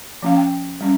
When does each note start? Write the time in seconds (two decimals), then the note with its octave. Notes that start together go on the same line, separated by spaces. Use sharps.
0.23 F3 A#3 C#4 F5
0.37 G5
0.81 G3 C#4